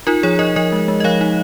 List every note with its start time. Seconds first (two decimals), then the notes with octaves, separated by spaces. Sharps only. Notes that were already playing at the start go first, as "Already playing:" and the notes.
0.07 D#4 F4 A#4
0.23 F3 G#4 C#5
0.39 D#4 A#4 D#5
0.56 F3 A#4 D#5
0.72 G#3
0.88 G#3
1.00 D#5
1.04 F3 C#5 F5
1.21 D#4